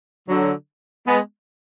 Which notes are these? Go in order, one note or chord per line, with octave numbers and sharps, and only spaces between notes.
D3 F#3
G#3 B3